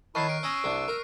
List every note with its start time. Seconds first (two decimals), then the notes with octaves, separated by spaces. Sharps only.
0.15 D#3 E4 C#5 A5 C#6 F#6 C7
0.29 A#4 D7
0.43 C#4 A#5 D#6 E6
0.64 C2 D4
0.88 A#4